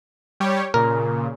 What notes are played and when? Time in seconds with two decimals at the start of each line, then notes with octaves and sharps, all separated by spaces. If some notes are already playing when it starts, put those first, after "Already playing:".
0.40 G3 G4 C#5
0.74 A#2 C#3 A#4